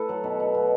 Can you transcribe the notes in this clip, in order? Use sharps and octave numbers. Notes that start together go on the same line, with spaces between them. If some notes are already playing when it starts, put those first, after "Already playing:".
Already playing: A3 E4 A4 B4
F#3
B2
F#3
B2